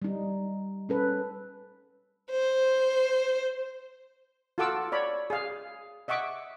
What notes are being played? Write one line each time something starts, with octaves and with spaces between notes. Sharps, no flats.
G3 D#4
C#4 A4 B4
C5
F4 F#4 A4 F#5 D6 E6
C#5 D5 B5
G#4 F5
D#5 E5 F#5 C#6 D6